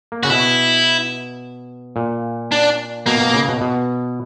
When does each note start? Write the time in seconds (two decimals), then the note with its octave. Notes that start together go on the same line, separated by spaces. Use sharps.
0.12 A#3
0.23 C#3 F#4
0.30 B2 E4
1.96 A#2
2.52 D4
3.06 B2 A#3
3.20 B2
3.34 C#3
3.48 B2
3.61 B2